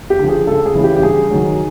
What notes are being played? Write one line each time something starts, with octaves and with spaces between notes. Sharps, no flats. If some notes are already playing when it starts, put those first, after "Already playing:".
G4
D3
F3 G#4
C#2 A4
G#4
C#3 E3
G4
G4
G2 G#4
D#3 F#3